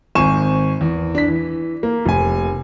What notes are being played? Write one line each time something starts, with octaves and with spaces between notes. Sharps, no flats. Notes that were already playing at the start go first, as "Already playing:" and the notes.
G#1 C4 G#5 C#6 E7
E2
D4 B6
E3
A#3
F1 G#5